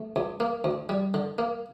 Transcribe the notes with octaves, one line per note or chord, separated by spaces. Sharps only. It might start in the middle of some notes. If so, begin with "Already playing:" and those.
Already playing: A3
C#2
A#3
D2
G3
D3
A#3